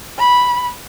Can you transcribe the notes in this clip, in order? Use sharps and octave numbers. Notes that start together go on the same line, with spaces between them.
B5